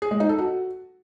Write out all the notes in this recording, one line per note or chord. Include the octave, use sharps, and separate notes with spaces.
G#4
G#3
D#4
A4
F#4